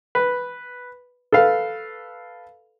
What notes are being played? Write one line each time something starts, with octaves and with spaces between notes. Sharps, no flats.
B4
A4 B4 F5